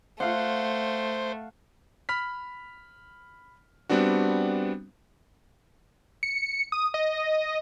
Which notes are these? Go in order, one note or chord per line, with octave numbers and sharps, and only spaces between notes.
A3 C5 F5 F#5
B5 F6 B6
G3 B3 C4 D4 F#4
C#7
D#6
D#5